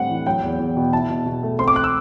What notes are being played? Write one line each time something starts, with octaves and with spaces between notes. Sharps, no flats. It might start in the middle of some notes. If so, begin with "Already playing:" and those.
Already playing: A2 D3 G3 C4 F#5
E3
F#3 G5
E2
E2
B2
E4 A5
B2
B2
A3
C4 C6
D6
F#6
E6